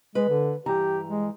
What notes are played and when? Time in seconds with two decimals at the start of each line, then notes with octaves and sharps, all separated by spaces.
0.15 G#3 B4
0.29 D3
0.66 G2 E3 G4 A#5
1.08 G#3